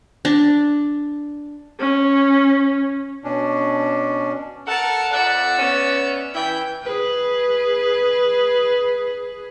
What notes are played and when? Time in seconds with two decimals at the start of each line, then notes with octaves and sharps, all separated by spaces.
0.25 D4
1.79 C#4
3.24 B2 C#4 D4
4.67 A4 A#4 F#5 A5
5.12 F2 D5 E5 F#5
5.58 B3 C#4
6.35 E3 E4 G5
6.83 G#4 B4